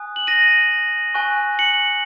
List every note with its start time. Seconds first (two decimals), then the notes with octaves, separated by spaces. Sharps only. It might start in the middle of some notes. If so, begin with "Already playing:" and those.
Already playing: G#5 D#6 F#6
0.16 F#7
0.27 A#6 D#7
1.14 G#5 C#6 F#6
1.59 C#7 F#7